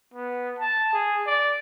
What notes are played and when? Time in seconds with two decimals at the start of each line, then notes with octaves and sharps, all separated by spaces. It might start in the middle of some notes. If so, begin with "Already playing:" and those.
0.14 B3
0.59 A5
0.93 G#4
1.26 D5